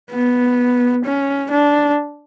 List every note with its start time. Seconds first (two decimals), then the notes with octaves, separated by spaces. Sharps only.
0.11 B3
1.05 C#4
1.51 D4